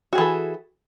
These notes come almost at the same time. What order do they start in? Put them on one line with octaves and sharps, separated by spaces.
F#4 G#4 E3 A4